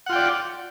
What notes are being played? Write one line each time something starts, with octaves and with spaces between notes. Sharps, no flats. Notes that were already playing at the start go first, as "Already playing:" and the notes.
F4 D5 F#5 G5